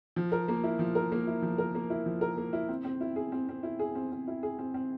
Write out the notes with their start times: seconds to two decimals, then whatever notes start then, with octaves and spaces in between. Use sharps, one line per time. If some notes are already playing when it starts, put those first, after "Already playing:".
0.16 F3
0.32 A#4
0.48 A#3
0.64 E4
0.79 F3
0.95 A#4
1.12 A#3
1.27 E4
1.42 F3
1.58 A#4
1.75 A#3
1.90 E4
2.06 F3
2.21 A#4
2.37 A#3
2.53 E4
2.68 C4
2.84 C4
3.01 E4
3.16 G#4
3.32 C4
3.49 C4
3.63 E4
3.79 G#4
3.95 C4
4.12 C4
4.27 E4
4.43 G#4
4.58 C4
4.74 C4